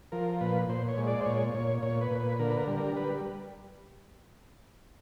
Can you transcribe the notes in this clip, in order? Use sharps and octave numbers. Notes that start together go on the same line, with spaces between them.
F3 A#4
A#2 B4
A#2 C5
C#5
G#3
D5
C5
A#2 C#5
A#2 C#5
A#2 C#5
B4
A#2
B4
D3 A#4
B4
A#4
G3
A#4
G3 B4